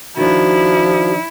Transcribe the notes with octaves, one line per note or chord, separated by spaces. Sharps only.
D#3 F3 D4 E4 F#4